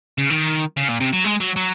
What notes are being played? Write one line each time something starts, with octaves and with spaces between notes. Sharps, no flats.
C#3
D#3
C#3
A#2
C3
F#3
G#3
F#3
F#3